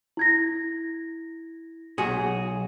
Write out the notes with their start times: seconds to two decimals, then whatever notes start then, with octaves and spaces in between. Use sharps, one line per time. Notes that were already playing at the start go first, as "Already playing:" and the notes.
0.17 E4 G#6 A#6
1.98 B1 F#4 G#4